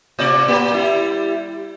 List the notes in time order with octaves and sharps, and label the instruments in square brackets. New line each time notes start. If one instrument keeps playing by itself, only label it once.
[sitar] A2 C3 D5
A#3 G4
G3 E4